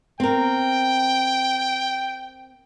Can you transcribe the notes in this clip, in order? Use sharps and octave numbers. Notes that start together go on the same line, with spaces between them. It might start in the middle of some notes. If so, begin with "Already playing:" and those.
C4 A#4 G5